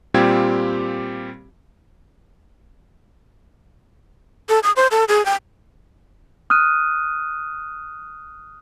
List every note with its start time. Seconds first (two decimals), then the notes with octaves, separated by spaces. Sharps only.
0.14 A#2 G3 C4 F4 G4 G#6
4.49 A4
4.63 D#6
4.76 C5
4.91 A4
5.08 G#4
5.26 G5
6.50 D#6 F6 F#6 D#7